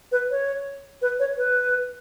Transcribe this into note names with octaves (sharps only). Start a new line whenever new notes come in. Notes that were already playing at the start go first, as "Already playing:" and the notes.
B4
C#5
B4
C#5
B4